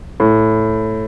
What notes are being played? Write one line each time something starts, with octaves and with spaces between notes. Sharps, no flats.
A2